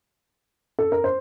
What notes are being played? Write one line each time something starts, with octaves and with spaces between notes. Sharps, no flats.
A4
A#4
C5